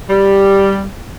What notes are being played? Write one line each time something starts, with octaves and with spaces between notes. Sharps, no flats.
G3